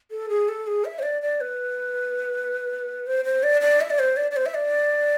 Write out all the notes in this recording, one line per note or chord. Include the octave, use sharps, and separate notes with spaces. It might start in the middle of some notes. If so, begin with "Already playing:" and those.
A4
G#4
A4
G#4
E5
C5
D5
D5
B4
C5
C5
D5
D5
E5
D5
C5
D5
D5
C5
E5
D5